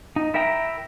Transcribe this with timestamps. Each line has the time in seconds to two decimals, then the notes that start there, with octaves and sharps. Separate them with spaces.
0.16 D#4
0.34 E4 A#4 E5 G5 A#5